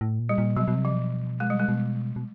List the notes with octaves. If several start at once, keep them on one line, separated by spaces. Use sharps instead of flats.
A2
A#2
G3
A#2
B2 F#3
B2
C3
F3
B2
G#3
G3
G#3
B2
B2